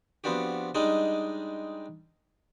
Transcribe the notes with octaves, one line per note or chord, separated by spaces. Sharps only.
F3 B3 C4 D4 F#4 G4
G3 G#3 D4 D#4 D#5